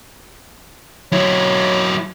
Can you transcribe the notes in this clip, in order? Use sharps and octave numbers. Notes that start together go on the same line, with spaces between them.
F#3 E4 C#5